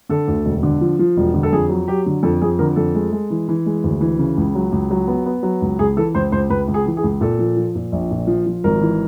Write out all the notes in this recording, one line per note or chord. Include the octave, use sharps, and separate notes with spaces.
D3 A4
D2
E1
D3
F3
F3
E1
D3
A4
F2 G#4
F#3
F#3 G4
D3
F2 A4
F2 G#4
D3 A#4
F2 A4
G#3
G#3
E3
E3
G#3
D2
E3
C#3
C#2
F#3
C#2
F#3
B3
B3
F#3
C#2
C#2 G#4
E3 A4
C#2 C5
C#2 C5
C#2 B4
C#2
G#4
E3
G#4
C#2
A#2 A4
F3
F3
A#2
A#1
A#2
F3
F3
G#1 A#4
E3